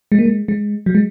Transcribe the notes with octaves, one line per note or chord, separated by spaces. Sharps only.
G#3
A#3
G#3
G#3
F#3
G#3